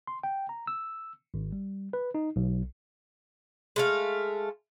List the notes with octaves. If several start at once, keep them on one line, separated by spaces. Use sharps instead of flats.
C6
G5
A#5
E6
G#1
G3
B4
D#4
B1
G#3 A3 F5